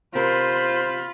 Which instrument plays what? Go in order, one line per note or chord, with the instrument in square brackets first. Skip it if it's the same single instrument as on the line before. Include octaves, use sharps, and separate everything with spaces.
[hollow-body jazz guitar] C3 A#4 [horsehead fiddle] F4 [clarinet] C5 [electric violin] B5